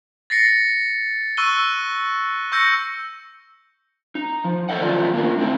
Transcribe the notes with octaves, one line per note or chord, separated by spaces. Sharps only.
A6 A#6 C7 C#7
C#6 E6 F#6 D#7 G7
C#6 E6 G6 A#6 C#7
D#4
F3
A4 A#4 C5 D#5 F#5
D#3 F3 F#3 A3 F4 D5
A#3 B3 D4 F4 A#4
A3 C4 E4